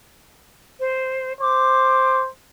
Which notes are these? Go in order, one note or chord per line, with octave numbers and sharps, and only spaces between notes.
C5
C5 D6